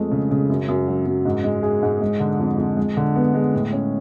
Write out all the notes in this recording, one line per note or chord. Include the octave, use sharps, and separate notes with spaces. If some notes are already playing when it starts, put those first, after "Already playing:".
Already playing: F2 G#3 A3
C#3
C#3
F#2
F#2
F#3
F#2
G#2
G#3
G#4
G#2
G#3
D3
F2
F2
G#3
D3
B3
G#3
A2
C#4